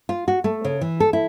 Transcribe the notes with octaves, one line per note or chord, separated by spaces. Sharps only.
F4
F#4
A3
C#3
E3
A4
E4